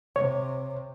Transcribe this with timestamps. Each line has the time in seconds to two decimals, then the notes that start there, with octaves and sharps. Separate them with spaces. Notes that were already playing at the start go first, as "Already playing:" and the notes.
0.16 C3 C#5